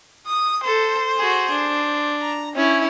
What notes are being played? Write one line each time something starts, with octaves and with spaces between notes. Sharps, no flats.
D#6
A4 C5
F#4 G#4
D4
A#5
C#4 E4 C#5